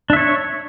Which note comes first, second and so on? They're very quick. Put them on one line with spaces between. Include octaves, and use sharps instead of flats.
D4 E5 C#5